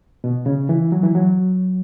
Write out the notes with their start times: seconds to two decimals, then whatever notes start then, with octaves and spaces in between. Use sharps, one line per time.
0.24 B2
0.46 C#3
0.69 E3
0.92 F#3
1.03 E3
1.15 F#3